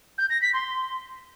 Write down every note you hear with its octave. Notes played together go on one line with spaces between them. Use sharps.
G6
A#6
B6
C6